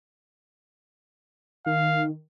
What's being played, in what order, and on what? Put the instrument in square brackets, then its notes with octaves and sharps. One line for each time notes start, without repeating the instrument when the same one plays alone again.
[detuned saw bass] D#3 [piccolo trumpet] F5